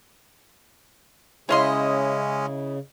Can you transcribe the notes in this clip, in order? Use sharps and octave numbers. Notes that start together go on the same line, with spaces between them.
C#3 G#3 C#4 E4 C#5 D#5 F5 C6